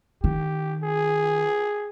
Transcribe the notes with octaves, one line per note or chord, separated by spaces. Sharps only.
D#3 G4
G#4